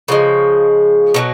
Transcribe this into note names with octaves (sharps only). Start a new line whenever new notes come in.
C#3 F3 G#3
B2 F#3